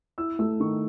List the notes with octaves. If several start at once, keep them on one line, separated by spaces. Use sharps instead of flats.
E4 E6
A3 E6
D#3 C#6